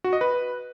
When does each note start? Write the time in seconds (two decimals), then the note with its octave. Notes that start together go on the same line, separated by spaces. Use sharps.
0.04 F#4
0.13 D#5
0.21 B4